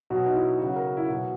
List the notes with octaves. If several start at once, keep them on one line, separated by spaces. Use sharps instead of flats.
B2 F#3 F#4
D#4
E4
C#3 F#3 F#4
A#4
E4
B2 F#3 F#4